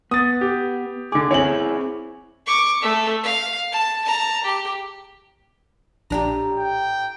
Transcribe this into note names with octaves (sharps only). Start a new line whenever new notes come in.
B3 D#6 A6
G4
D3 G#4 D6
C4 E4 G#4 C#5 F#7
C#6 D6
A3 E5
F5
A5
A5 A#5
G4
A#1 A2 D4 G4 A#5
G5